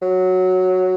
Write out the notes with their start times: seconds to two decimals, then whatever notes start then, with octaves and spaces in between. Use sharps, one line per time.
0.02 F#3